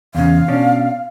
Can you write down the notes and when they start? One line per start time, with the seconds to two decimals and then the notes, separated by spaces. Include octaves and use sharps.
0.15 E2 C#3 F5
0.48 B2 C#4 D4